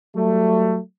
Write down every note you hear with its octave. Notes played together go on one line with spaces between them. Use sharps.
F#3 G3 A3